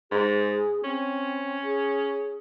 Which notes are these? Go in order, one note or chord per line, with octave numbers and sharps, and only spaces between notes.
G#2 G#4
C4 C#4
G#4